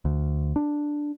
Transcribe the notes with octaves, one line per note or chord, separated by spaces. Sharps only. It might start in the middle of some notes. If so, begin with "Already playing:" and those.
D2
D4